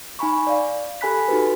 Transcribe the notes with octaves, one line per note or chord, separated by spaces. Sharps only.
D#4 G#5 B5 C#6
D5 F5
G4 A4 G#5 B5 F#6 B6
D#4 F#4 G4 A4 B4